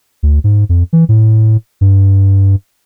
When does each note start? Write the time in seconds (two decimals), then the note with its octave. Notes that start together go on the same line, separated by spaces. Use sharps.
0.23 D2
0.44 G#2
0.69 F2
0.93 E3
1.09 A2
1.81 G2